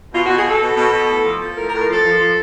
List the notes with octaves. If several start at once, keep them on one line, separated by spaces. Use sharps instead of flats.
B2 F4
B2 F#4
G#4
B2 A4
B2
B2
B2
A2
F3
F3
A2 A#4
A#4
A2
A#4
F3 A4
F3
F3